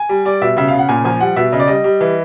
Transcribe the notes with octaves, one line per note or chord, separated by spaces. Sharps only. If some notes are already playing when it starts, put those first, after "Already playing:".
Already playing: G#5
G3
G3 D5
B2 E5
C#3 E5
C#3 F5
F#5
A#2 G#5
F3 G#5
G3 F#5
B2 E5
C#3 D#5
D5
G3 D#5
G3
E3